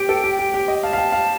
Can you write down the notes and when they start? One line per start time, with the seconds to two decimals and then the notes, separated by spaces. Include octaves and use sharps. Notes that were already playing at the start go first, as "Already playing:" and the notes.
Already playing: G4 G5
0.09 A4
0.24 G4
0.39 G4
0.54 G4
0.68 D#5
0.83 F5 A5
0.93 F5
0.98 G5
1.12 F5